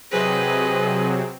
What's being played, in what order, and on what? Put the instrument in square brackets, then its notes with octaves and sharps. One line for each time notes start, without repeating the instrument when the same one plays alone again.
[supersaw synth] C3 F#3 C4 [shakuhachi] G#4 [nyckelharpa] B4 D#5